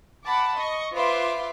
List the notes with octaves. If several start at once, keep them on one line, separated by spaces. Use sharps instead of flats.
F#5 A5 B5 D6
D#5 C#6
F4 B4 C5 E5 C6 D6